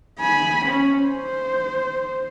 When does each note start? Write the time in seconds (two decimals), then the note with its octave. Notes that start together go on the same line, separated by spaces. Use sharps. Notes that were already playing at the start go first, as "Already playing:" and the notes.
0.20 G#5 B5
0.66 C#4
1.02 C5